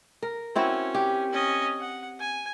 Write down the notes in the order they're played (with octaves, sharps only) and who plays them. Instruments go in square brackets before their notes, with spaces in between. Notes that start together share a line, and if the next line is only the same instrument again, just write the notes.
[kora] A#4
[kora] C4 E4 F#4 [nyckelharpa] C#4
[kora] G4
[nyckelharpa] C#4 D#5
F#5
G#5